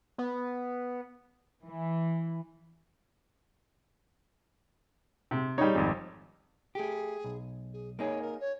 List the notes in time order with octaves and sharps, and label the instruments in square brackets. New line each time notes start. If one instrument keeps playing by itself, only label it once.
[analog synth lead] B3
[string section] E3
[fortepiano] C3
[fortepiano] G3 D#4 [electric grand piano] C#5
[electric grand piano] G#1 F2
[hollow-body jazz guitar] A3 G4 [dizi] G#4
[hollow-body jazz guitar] B1
[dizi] G#4
[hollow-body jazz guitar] A#3 D#4 G#4 [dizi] C#5
[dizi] A#4
C#5